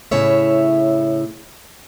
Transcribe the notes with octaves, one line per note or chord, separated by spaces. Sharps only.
A2 C#3 E4 C#5 E5